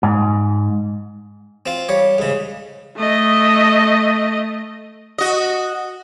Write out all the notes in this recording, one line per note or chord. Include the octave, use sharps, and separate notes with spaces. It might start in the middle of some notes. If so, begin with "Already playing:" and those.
G#2
C4 F4
G3 C#5
G#2 C#3
A3 D#5
F#4 D#5